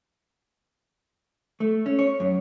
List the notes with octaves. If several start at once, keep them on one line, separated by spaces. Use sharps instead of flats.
A3
C#4
C#5
F#2